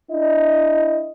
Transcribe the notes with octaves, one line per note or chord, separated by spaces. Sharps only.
D4 E4 D#5